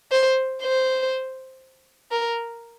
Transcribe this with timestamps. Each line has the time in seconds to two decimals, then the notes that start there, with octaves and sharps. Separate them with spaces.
0.12 C5
0.62 C5
2.11 A#4